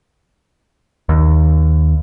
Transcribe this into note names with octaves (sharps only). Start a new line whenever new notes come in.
D#2